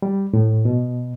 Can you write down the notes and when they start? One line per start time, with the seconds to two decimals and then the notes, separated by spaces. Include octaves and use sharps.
0.02 G3
0.34 A2
0.65 B2